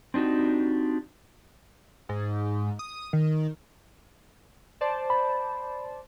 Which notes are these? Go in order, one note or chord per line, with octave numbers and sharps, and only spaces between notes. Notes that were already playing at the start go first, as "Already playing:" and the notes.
C4 D4 D#4 F#4 G4
G#2
D#6
D#3
C5 D5 A5
B5